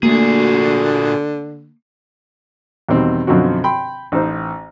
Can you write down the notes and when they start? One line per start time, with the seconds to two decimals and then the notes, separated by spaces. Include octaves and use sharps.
0.03 A#2 D3 A3 A#3 F#4 G#4
2.89 E2 B2 D#3 G3 C4
3.27 F#2 B2 D3 F3 C4 F#4
3.64 G5 B5 C6
4.12 A1 D#4 C5